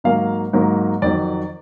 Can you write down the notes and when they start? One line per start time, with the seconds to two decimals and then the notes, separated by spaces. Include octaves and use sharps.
0.04 G#2 F#3 A#3 F5
0.53 G#2 F#3 A#3
1.02 F2 D#3 F#3 D5